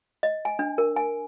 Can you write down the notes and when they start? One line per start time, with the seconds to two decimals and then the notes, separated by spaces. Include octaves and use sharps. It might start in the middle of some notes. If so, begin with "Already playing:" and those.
0.23 D#5
0.45 G#5
0.59 D4
0.78 A#4
0.96 G#5